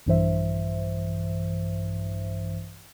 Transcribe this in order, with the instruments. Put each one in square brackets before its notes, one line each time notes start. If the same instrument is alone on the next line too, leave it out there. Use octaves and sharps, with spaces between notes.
[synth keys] A#1 G2 E3 C5 E5